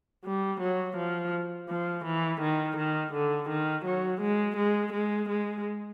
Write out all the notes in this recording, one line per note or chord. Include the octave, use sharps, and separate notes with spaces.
G3
F#3
F3
F3
E3
D#3
D#3
D3
D#3
F#3
G#3
G#3
G#3
G#3